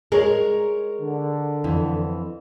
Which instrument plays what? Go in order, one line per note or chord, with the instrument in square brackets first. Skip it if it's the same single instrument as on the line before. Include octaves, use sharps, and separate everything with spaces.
[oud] G#3 [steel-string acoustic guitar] A#4 C#5
[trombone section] D3
[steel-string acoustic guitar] F2 E3